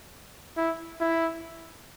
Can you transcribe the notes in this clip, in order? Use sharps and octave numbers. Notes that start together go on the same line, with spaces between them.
E4
E4